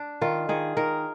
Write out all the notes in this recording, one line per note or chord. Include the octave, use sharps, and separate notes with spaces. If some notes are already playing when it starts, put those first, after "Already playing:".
Already playing: D4
D#3 F4
D#3 G#4
D#3 A#4